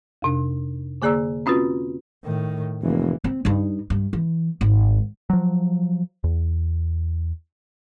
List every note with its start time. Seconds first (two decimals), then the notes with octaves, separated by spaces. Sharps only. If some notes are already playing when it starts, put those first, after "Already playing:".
0.22 F2 C3 D4
1.02 D3 A#3 G#4 D5 A#5 E6
1.46 C4 C#4 F4 F#4 B4
2.24 A2 D#3
2.82 F1 E3 A#3
3.24 C4
3.45 G2 D#4
3.90 G2
4.13 E3
4.61 G#1
5.30 F3 F#3
6.24 E2